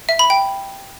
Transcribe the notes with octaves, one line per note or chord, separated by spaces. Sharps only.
E5
B5
G5